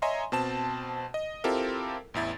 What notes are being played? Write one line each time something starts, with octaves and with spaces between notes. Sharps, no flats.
C#5 D#5 E5 G#5 A#5 C6
B2 C4 A5 E7
D#5
C4 E4 F4 G4 A4 A#4
A1 E2 E4 A6